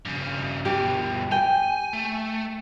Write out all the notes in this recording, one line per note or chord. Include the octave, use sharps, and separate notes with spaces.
G2 C#3
G2 B2 G4
G5 G#5
A3